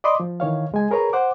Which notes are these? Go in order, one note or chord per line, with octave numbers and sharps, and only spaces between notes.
D5 D#5 B5 C6 D6 D#6
F3
D#3 E3 C#5 F5
C#2 G#3 G#5
G#4 A#4 B4 C#5 A#5
C5 F#5 D6